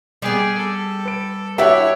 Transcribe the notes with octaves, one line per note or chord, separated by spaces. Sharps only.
G3 B3 G#4
A4
B4 D7
D4 E4 F#4 G4 B4 C#5 E5